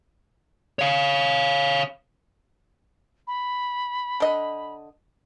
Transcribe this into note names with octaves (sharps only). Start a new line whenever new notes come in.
C#5 F5
B5
D3 D#5